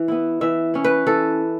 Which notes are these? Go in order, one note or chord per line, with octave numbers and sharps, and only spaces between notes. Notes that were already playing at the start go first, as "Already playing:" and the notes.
Already playing: E3
B3 E4
E3 E5
C#4 E4
B4
E3 A4